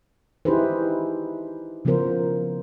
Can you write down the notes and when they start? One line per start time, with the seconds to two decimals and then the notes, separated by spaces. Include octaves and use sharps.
0.45 D#4 E4 G4 G#4 B4 C5
1.85 C#3 F3 B3 F4 A#4 C5